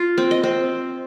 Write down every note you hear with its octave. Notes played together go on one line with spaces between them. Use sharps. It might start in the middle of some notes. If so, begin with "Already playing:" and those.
Already playing: F4
C4
D#5
C4